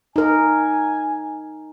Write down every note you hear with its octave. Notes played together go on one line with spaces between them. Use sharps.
D#4 A#4 G#5